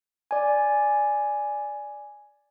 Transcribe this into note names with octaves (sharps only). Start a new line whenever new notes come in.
D5 G#5